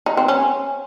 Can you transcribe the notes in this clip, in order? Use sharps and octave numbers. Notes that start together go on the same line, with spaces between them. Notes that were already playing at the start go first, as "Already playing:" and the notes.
D#4
C4
C#4